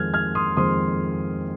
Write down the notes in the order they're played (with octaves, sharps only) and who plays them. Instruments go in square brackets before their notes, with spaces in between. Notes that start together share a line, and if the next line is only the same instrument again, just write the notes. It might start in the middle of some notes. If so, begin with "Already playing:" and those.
Already playing: [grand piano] F2 D#3 G#3 C4 F6 G#6
F6 G#6
C6 D#6
F2 D#3 G#3 C4 C6 D#6